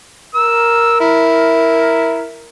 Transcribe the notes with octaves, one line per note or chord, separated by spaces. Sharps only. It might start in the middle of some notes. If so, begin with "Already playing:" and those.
A#4 E6
E4